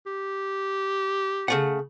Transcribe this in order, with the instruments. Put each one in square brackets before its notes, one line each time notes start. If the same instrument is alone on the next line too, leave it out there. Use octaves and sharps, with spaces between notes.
[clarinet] G4
[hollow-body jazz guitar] C#3 A3 F#5